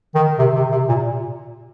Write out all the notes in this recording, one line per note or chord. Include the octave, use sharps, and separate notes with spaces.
D#3
C3
C3
C3
A#2